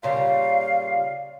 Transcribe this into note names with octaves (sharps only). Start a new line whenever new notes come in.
A#2 C#3 G3 F5